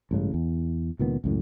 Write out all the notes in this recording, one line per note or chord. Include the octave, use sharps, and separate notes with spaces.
A1 G2 C#3 G#3
E2
C#2 A#2 D#3 B3
C#2 F#2 A2